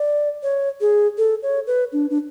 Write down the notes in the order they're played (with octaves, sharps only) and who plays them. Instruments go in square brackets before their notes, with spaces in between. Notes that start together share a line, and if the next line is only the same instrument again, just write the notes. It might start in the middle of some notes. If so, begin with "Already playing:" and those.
Already playing: [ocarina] D5
C#5
G#4
A4
C#5
B4
D4
D4